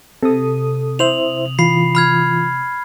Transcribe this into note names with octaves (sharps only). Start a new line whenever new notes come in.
C3 A4 D#6
E4 C5 E5 F7 F#7
E3 F4 B5 C7
B5 F6 G#6